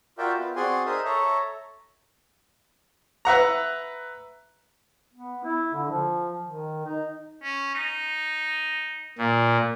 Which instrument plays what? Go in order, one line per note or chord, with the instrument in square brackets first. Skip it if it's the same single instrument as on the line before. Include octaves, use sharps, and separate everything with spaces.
[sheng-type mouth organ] F4 F#4 A#4 D5 E5 G5
B3 F4
C4 F#4 G#4 D5 G#5 C6
D#4 G#4 A#4 C5 E5 D#6
A4 C#5 E5 A#5
[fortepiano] B4 E5 F#5 A#5
[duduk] B3
E4
D3
F3
D#3
D#4
[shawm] C#4
D#4
[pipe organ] A#2